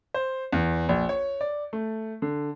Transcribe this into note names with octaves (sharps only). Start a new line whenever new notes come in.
C5
E2
A#1
C#5
D5
A3
D3